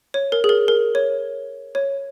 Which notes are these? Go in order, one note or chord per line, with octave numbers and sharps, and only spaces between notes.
C#5
A#4
G#4
A#4
A#4
C#5
C#5